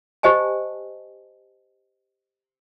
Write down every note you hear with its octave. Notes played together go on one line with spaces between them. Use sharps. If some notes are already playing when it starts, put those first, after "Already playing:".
G4 C5 D#5 G#5 A5